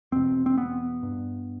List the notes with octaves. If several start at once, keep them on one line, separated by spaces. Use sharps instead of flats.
E2 B2 C4
C4
B3
G2